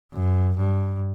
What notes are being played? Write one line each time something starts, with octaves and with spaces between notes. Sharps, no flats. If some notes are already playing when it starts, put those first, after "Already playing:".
F#2
G2